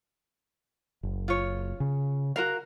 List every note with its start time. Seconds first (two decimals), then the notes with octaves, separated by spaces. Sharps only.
1.03 F#1
1.28 F4 C#5
1.80 C#3
2.36 F#4 A#4 F5